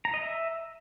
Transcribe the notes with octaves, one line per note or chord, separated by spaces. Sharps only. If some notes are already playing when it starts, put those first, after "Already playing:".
A#5
D#5
E5